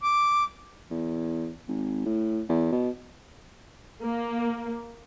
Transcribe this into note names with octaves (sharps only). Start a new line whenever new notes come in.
D6
E2
G#1
A2
E2
B2
A#3